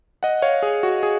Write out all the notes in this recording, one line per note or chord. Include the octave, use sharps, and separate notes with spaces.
D#5 F#5
C#5 F5
G#4
F#4
G#4